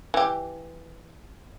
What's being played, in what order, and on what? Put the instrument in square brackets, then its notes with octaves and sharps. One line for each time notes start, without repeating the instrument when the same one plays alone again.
[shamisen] E3 G4